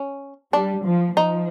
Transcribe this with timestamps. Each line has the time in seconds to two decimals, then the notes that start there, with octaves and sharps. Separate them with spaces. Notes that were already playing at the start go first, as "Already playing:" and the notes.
Already playing: C#4
0.53 G3 D4
0.85 F3
1.17 F3 D#4